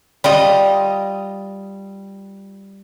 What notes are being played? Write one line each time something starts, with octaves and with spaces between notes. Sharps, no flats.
G3 F4 D#5